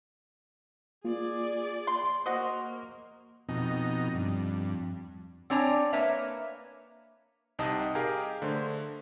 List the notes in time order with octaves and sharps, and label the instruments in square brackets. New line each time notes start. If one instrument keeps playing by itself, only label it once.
[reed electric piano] A#3 F4 [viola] G#4 D5
[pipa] C6
[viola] A#3 [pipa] F#4 C5 D#5 [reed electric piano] C#6
[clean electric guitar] F2 [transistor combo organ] B2 D#4
[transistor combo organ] G2
[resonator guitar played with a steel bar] C4 D4 C#5 G#5 A#5
A#3 B4 C#5 E5 A#5
[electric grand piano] C2 C3 D#4 D#5 A5 D#6
G4 G#4 A#4 D#5 F5
D3 A3 C5